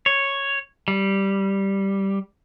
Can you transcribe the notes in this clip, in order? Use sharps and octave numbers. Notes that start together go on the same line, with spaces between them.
C#5
G3